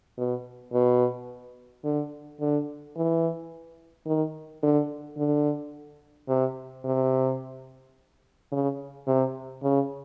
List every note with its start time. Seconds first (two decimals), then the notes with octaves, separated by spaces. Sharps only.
0.18 B2
0.73 B2
1.84 D3
2.41 D3
2.96 E3
4.06 D#3
4.63 D3
5.17 D3
6.28 C3
6.85 C3
8.52 C#3
9.07 C3
9.63 C#3